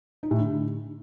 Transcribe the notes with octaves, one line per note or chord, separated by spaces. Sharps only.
D#4
A2
D3